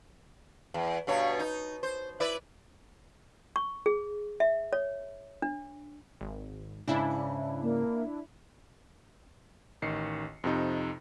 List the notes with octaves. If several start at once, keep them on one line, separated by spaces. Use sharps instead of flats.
E2
G2 B2 C#5
D#4
C5
E4 B4 D5
C#6
G#4
E5
C#5
D4
G#1
G#2 C#3 D4 E4
A#3
A1 D#3 C7 C#7
F2 C3 D#4